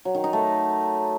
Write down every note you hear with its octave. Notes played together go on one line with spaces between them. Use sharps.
F#3
D#3
D#4
A3